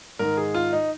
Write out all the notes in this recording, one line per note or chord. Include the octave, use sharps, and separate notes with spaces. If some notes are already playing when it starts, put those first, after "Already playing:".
G#2 D#3 A#4
G#4
F4
D#4